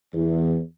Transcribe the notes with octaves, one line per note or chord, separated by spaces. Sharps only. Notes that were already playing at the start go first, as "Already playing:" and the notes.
E2